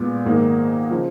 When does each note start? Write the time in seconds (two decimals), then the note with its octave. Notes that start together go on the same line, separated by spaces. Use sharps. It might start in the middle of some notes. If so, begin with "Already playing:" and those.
Already playing: A#2 G#3 B3
0.25 G#2 D#3 A#3 D#4 G#4
0.91 C#3 F3